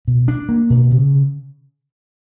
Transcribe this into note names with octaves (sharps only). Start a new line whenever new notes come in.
B2
D4
A#3
B2
C#3